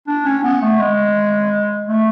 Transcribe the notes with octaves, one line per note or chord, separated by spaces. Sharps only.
D4
C#4
B3
A3
G#3
A3